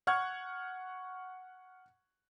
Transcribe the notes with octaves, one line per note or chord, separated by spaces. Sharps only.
F#5 C#6 F6 G#6